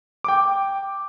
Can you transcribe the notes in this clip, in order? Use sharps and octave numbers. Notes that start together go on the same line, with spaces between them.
G5 D6